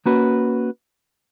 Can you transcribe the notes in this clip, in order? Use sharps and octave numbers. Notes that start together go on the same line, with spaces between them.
A#3 C#4 F#4 B4